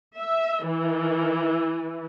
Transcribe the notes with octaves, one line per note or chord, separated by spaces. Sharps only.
E5
E3